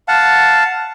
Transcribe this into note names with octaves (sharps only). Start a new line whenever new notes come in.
F5 F#5 A5